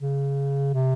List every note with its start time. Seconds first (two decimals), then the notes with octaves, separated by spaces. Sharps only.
0.01 C#3
0.73 C3